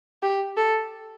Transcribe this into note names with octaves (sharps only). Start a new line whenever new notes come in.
G4
A4